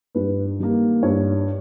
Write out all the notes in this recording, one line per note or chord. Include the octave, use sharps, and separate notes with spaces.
G2 B4
D#3 G3 A#3
G2 C#5